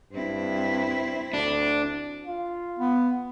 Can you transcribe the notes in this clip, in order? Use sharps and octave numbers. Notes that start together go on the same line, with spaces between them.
G2 C4 E4
D2 D4
F4
B3